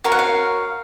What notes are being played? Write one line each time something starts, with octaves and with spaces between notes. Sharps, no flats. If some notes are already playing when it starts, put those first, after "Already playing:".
F#4 A#4 C#5 F5
F#5
F5